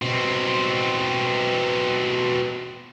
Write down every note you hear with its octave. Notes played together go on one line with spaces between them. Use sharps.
B2 C4